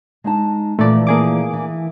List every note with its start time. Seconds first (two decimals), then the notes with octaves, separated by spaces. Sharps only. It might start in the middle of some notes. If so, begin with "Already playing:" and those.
0.24 G#3 D#4 A5
0.79 A#2 E3 F3 A3 D5
1.07 A#3 G#4 D6
1.53 E3